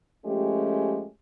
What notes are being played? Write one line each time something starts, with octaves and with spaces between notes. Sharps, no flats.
F3 G#3 A3 C#4 G4